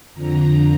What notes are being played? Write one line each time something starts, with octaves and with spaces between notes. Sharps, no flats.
F2 D3 F3 A#5